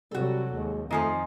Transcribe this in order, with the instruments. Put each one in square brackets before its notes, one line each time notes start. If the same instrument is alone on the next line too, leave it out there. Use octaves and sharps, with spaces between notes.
[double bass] C3 F#3 [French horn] G3 [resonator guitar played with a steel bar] F#4 A4
[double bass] D#2 [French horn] G#3
[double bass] F2 [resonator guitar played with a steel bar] D#3 F3 D#4 [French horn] A3 [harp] D#5 G#5 C6